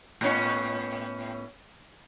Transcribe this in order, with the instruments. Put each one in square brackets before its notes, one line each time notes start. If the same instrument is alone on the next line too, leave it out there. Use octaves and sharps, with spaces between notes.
[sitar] A2 B3 C#4